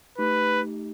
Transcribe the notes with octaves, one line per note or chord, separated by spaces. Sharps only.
A3 D#4 G4 B4